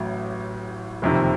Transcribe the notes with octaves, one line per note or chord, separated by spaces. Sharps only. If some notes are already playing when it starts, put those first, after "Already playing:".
Already playing: A1 A2 F#3
F#1 F2 C3 D#3